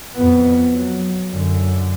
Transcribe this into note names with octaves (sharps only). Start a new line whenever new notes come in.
F2 B3
F#3
F#2 D3